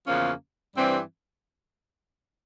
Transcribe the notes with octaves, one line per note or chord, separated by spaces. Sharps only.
E2 C#3 F3 A#3 C#4
G2 E3 G3 C4